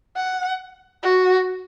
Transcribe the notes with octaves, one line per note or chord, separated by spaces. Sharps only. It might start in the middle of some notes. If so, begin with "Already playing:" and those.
F#5
F#4